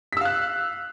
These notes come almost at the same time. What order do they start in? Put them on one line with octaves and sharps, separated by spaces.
B6 E6 F5 F#6